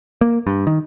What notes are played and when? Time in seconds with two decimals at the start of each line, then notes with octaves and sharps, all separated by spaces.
0.21 A#3
0.47 G2
0.67 D#3